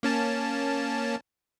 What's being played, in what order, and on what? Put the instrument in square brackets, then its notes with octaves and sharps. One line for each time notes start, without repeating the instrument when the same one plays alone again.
[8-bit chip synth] A#3 C#4 A5